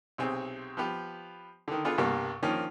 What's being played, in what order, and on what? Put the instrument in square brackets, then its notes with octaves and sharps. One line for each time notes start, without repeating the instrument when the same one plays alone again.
[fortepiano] B1 C3 C4 G#4
F3 B3 G4
D3 D#3
B3 D4 F4 G#4 A4 B4
C2 G2 B2 G3 A#3
D#3 F3 A#3 C#4 D4